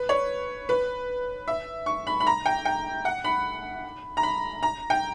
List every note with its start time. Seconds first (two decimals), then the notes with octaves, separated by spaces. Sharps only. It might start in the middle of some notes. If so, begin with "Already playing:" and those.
Already playing: B4
0.09 C#5
0.69 B4
1.48 E5
1.86 C#6
2.07 B5
2.20 B5
2.27 A#5
2.46 G5
2.65 G5
3.05 F#5
3.24 B5
4.17 A#5
4.23 B5
4.63 A#5
4.90 G5